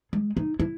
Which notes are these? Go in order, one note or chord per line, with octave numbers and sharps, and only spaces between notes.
G#3
D#4
E4